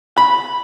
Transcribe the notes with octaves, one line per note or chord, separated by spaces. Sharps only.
B5